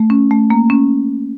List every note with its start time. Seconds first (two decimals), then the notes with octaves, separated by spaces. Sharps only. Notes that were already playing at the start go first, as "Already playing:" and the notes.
Already playing: A3
0.10 C#4
0.31 A3
0.50 A#3
0.70 C#4